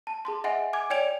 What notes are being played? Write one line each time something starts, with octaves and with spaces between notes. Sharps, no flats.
A5
G#4 A5 C6
D#5 E5 F#5 G#5
G#5 D6 G#6
C#5 D5 G5 G#6 D7 F7